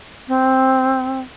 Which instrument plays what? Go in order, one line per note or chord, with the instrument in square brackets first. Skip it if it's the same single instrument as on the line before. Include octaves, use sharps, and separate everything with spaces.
[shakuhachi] C4